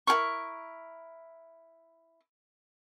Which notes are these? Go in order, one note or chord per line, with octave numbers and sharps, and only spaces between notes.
E4 G#4 A#4 C#6